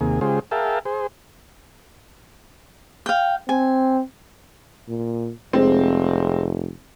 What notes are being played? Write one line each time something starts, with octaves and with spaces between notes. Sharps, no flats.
D#2 C3 A#3 G#4
C#3 G#3 F4 G4 G#4 C5
G#4 A#4 E5 F5 G5 A5
G#4 C5
F5 G5
C4 G#5
A#2
F1 G#3 C4